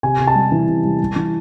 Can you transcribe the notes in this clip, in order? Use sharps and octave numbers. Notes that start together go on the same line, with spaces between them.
C3 G#5
C3
A5
G3
E3
C3
G3
G3
E3